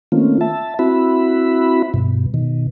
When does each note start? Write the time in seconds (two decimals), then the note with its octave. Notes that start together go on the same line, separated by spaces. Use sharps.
0.12 D#3 A3 A#3 C4 C#4 F4
0.41 E5 A5
0.79 C4 E4 F#4 E5 B5
1.94 G2 B2
2.34 B2 D#3